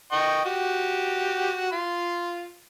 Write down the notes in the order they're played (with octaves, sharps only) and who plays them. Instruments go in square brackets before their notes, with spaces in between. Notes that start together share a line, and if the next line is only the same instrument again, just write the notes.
[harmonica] D#5 G5 C#6
F#4 G4
F4 C6